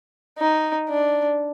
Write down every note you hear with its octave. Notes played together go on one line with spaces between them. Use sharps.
D#4
D4